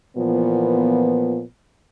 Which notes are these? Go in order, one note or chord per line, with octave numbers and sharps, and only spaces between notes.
A#2 E3 F3 B3